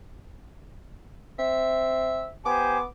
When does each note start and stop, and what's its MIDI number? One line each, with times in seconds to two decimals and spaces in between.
1.39 2.32 60
1.39 2.29 76
2.46 2.85 59
2.46 2.78 67
2.46 2.78 72
2.46 2.78 80
2.46 2.83 86